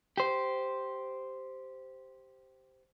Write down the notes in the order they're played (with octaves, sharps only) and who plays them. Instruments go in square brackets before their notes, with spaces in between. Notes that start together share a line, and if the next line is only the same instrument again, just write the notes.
[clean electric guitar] G4 C5